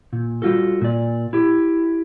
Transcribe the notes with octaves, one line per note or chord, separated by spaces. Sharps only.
A#2
G3 F4 F#4 A4
A#2 D5
E4 G4